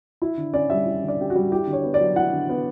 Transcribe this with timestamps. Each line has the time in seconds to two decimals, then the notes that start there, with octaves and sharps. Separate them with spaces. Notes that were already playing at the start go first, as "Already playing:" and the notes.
0.22 E4
0.37 D3
0.54 C#4 D5
0.70 G3 E5
0.86 E4
1.03 D3
1.08 D5
1.19 C#4 G4
1.30 F#4
1.36 G3
1.51 E4 G4
1.67 D3
1.73 C#5
1.83 B3
1.94 D5
2.00 F#3
2.16 E4 F#5
2.32 D3
2.49 B3